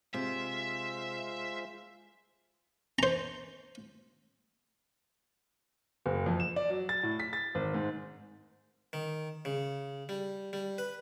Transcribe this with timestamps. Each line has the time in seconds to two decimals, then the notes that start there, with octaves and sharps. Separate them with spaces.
0.14 C3 G#3 F4 C5 E5
2.99 C5 A#5
6.06 F#1
6.26 F2
6.40 E7
6.56 D5
6.70 F#3
6.89 A6
7.03 A2
7.20 B6
7.33 A6
7.55 G#1
7.74 G#2
8.93 D#3
9.45 C#3
10.09 G3
10.53 G3
10.78 B4